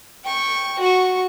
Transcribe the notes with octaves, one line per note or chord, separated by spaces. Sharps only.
G5 C#6
F#4 C#6